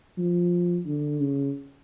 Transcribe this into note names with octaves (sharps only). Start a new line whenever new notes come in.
F3
D3
C#3